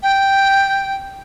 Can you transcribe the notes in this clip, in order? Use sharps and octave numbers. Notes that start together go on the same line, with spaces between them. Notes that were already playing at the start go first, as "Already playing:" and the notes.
G5